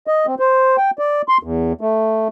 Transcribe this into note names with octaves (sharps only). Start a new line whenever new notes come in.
D#5
C4
C5
G5
D5
C6
E2
A3